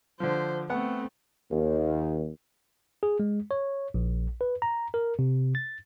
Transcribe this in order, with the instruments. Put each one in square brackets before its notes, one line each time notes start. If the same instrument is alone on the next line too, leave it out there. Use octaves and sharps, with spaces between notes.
[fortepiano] D3 F3 [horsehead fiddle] C5
[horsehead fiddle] A3 C4 [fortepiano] B3 F#5
[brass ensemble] D#2
[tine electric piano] G#4
G#3
C#5
A#1
B4
A#5
A#4
C3
A6